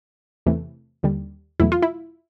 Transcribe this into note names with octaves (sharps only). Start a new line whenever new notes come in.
E2 C3 E3 A3
D#2 D3 G3
E2 B2 F#3 A3 E4
F4
E4